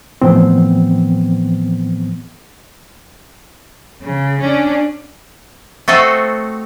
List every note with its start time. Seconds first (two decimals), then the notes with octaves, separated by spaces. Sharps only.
0.22 A2 E3 F3 B3 C4
4.02 C#3
4.41 C#4 D4
5.88 A3 C4 F#4 A4 D#5